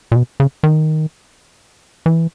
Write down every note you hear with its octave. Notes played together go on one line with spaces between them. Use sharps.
A#2
B2
C#3
D#3
E3